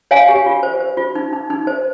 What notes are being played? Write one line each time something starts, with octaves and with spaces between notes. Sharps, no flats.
C#5 F5 G#5
G4
F4
C5
C5
F4
D#4
D#4
D#4
C5